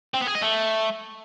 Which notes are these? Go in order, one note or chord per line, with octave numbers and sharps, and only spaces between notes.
C4
B3
G#4
D#5
A3